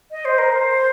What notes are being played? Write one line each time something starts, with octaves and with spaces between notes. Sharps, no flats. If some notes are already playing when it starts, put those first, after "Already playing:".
D#5
C5
A#4
C5